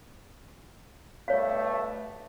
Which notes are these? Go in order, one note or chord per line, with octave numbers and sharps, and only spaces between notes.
G2 B2 A3 C#5 F5